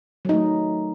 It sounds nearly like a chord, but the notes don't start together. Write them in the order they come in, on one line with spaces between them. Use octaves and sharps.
F#3 D#4 A3